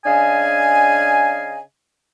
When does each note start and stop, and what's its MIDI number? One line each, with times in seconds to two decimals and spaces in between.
0.06 1.60 49
0.06 1.60 62
0.06 1.60 75
0.06 1.60 77
0.06 1.60 80